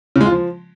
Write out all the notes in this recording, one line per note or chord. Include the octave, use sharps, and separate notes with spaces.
C#3
G#3
F4
F3